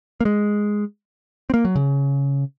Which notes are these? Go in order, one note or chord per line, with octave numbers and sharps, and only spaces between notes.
A#3
G#3
C4
A#3
F#3
C#3